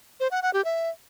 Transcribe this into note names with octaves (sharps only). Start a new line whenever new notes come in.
C5
F#5
F#5
G4
E5